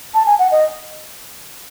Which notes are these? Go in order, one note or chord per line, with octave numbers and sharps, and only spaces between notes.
A5
G#5
F#5
D#5